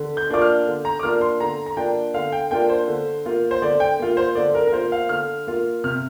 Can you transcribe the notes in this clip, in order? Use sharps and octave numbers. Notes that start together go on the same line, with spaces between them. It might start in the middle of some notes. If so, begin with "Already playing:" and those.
Already playing: D3
G6
A#3 D4 F4 D6
F6
D3
A#5
D6
A#3 D4 F4 F6
C6
D3 A#5
A#5
A#3 D4 F4 G5
D3 F5
G5
A#3 D4 F4 G5
C5
D3
A#3 F4
C5
D3 D5
G5
A#3 F4
C5
D3 D5
A#4
A#4
A#3 F4 C5
F5
D3 F6
A#3 F4
C3 F6